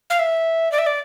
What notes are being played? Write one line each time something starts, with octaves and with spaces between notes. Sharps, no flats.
F5
E5
D5
E5
D5